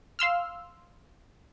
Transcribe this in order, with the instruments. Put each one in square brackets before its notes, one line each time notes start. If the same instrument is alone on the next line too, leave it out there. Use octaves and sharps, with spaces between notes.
[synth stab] F5 C6 E6 F6